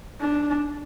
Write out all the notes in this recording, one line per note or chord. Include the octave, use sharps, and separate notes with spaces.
D4